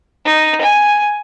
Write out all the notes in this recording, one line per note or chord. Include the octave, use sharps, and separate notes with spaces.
D#4
G#5